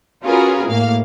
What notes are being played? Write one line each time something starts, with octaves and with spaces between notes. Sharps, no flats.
C#4 F4 F#4 G#4 A#4 B4
A2 A#3 F5